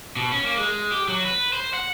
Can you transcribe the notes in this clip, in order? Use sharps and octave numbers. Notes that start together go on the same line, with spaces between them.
B2
C#4
A#3
G#3
G4
F#3
B4
C5
F#5